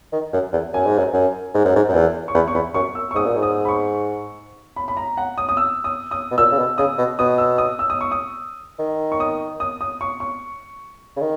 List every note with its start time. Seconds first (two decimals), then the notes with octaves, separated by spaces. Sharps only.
0.13 D#3
0.33 F#2
0.53 E2
0.73 F#2 G#5
0.86 G#2
0.98 F#2
1.14 F#2
1.55 G#2
1.65 F#2
1.76 G#2
1.89 F#2
1.94 E2
2.28 C#6
2.34 E2 B5
2.48 C#6
2.54 E2 B5
2.74 F#2 C#6
2.95 E6
3.11 C#6
3.15 G#2 D#6
3.26 A#2
3.36 G#2
3.43 D#6
3.65 B5
3.69 C#6
4.76 B5
4.88 B5
4.97 A#5
5.17 F#5
5.38 D#6
5.49 D#6
5.57 E6
5.84 D#6
6.11 D#6
6.31 B2
6.38 A#2 E6
6.52 C#3
6.59 B2
6.78 C#3 D#6
6.98 B2
7.19 B2 D#6
7.38 E6
7.58 D#6
7.79 E6
7.90 D#6
8.01 C#6
8.11 D#6
8.79 D#3
9.12 C#6
9.20 D#6
9.60 D#6
9.81 D#6
10.01 C#6
10.20 C#6
11.16 C#3
11.21 D#3